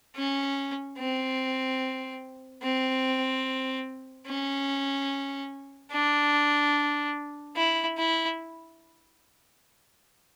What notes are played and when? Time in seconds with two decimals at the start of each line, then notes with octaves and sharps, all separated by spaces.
0.16 C#4
0.98 C4
2.63 C4
4.27 C#4
5.92 D4
7.56 E4
7.98 E4